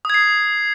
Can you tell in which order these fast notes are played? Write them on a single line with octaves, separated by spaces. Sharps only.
D#6 G#6 C7